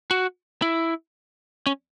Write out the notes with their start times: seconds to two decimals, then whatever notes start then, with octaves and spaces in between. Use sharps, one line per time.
0.11 F#4
0.62 E4
1.67 C#4